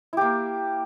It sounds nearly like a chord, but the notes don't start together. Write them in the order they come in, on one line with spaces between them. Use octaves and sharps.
E4 G4 A#3